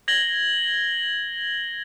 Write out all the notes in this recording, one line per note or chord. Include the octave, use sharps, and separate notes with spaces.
G#6 A#6 F#7 G7